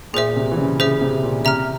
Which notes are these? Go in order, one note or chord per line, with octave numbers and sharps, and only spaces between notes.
A#2 G#4 C5 E5
A#2
C3
E3
C#3
C#3 G#4 C5 E5
C3
A#2
C#3
C3 E5 A#5 F6